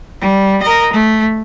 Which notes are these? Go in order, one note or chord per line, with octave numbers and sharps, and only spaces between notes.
G3
A#4 D#5
A3